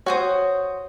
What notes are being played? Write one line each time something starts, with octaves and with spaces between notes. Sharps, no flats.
F#4 C5 C#5 D#6